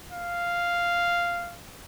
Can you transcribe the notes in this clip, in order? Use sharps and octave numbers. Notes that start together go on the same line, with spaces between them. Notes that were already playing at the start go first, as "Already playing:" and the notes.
F5